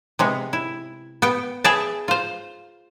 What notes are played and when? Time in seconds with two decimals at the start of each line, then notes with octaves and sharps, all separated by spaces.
0.19 C3 G#3 B3
0.53 E4
1.22 B3 G5
1.64 G#4 B4 E5 G5 A5
2.08 F4 C5